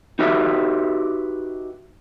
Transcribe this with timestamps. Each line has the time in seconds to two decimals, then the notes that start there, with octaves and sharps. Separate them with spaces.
0.19 D#4 F#4 G4 B4 E5